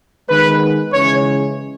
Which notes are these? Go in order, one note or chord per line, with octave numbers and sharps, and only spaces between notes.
D#3 G#3 B3 B4
C#3 E3 G#3 C#5